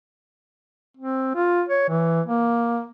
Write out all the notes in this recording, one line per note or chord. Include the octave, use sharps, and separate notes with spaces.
C4
F4
C#5
E3
A#3